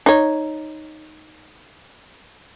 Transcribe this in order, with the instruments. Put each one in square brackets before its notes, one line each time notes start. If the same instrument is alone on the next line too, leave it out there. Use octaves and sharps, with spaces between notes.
[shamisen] D#4 C#5